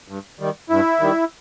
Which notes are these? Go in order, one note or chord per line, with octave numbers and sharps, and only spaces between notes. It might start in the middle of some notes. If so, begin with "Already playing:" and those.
G2
D#3 G3
G2 E4
D#3 G3